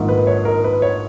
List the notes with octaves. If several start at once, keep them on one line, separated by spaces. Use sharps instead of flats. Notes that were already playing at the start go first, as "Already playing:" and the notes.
Already playing: A#1 G#2 D#3
B4
C#5
A#4
B4
C#5